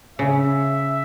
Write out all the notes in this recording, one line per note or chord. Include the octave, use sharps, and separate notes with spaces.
C#3 E5